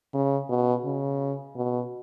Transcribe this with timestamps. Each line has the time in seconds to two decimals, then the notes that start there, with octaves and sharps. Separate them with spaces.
0.14 C#3
0.49 B2
0.85 C#3
1.56 B2